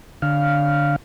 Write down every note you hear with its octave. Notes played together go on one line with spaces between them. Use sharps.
D3 F5